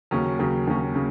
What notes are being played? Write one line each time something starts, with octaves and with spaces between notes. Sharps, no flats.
D#2 C#3 F#3 C#4
D#2 C#3 F#3 C#4
D#2 C#3 F#3 C#4
C#3